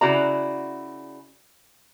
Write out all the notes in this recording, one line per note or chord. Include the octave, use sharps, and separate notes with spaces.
C#3 E4 F#4 D5 A#5